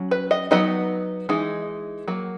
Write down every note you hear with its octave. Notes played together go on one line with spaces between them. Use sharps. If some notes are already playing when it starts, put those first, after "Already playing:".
Already playing: F#3 C#4
B4
D#5
F#3 B3 D#4 D#5
E3 G#3 D#4
F#3 A#3